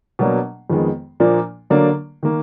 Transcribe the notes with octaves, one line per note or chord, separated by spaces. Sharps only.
B2 F#3 A#3 D4
F2 D#3 G#3 B3
A#2 F3 A#3 D4
D3 F#3 A#3 D4
D#3 A#3